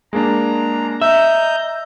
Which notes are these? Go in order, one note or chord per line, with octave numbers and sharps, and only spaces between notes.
G#3 A#3 D4 A#5
D#5 E5 A#5 E6 G6